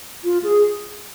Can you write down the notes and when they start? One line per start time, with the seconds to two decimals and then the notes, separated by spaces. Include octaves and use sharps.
0.24 F4
0.43 G#4